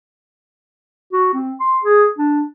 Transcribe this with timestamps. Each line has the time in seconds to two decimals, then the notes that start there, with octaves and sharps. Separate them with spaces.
1.12 F#4
1.34 C4
1.60 C6
1.83 G#4
2.18 D4